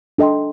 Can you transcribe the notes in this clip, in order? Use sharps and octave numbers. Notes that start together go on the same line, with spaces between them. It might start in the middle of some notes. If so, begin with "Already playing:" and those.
D4 A4 D#5 G5 C6